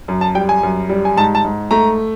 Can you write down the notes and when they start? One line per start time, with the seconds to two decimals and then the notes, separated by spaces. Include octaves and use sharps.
0.08 F#2
0.21 A5
0.35 G3 G5
0.49 G#5
0.63 F#2
0.89 G3
1.05 G#5
1.17 G#2 A5
1.35 A5
1.45 G#2
1.71 A3 A#5